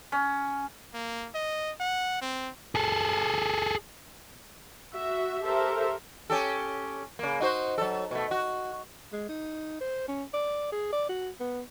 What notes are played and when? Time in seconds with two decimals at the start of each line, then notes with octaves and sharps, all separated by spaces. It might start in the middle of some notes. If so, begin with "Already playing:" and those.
0.12 C#4
0.94 A#3
1.34 D#5
1.80 F#5
2.21 C4
2.75 G#4 A4
4.93 F#4 E5
5.43 G4 A4 A#4 C5 E5
6.30 C#4 G4 A4
7.19 C#3 A#3
7.40 D#4 F#4 C5
7.78 F#3 A4
8.11 B2 A3
8.31 F#4
9.12 G#3
9.29 D#4
9.81 C5
10.08 C#4
10.34 D5
10.72 G#4
10.93 D5
11.09 F#4
11.40 B3